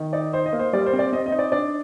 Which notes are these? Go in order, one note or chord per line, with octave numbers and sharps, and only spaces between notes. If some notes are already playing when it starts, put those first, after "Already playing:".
Already playing: D#3
D#4 D5
D#4 C5
D#5
A#3
C5
G3 D5
C5
C4
D5
C4 D#5
D#5
D#4
D5
D4 D5